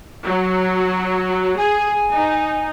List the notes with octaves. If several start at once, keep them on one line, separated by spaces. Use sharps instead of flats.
F#3
G#4 G#5
D#4